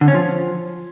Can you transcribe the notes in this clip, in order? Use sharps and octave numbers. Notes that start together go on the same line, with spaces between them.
D3
C#4
F3